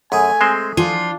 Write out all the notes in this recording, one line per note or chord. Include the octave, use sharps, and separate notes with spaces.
F#2 A3 G#4 G#5
G#3 C4 C5
F3 D4 F4 G#5